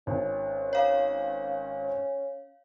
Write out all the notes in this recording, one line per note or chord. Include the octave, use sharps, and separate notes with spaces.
G#1 C#4
C#5 F5